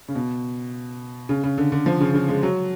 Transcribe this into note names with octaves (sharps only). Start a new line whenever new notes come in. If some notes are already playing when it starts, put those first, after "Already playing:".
C#3
B2
C#3
C#3
D3
D3
F3
C#3
C#3
G#3
F#3